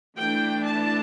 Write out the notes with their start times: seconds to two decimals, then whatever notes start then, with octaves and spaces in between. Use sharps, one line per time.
0.17 E3 A3 D4 G5
0.65 A5